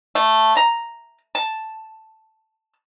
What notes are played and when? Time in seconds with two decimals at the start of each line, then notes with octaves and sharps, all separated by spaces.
0.15 A3
0.57 A#5
1.35 A5